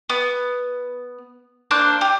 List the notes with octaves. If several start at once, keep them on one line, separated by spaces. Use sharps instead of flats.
B3
A#3 D4 C5 F#6
G4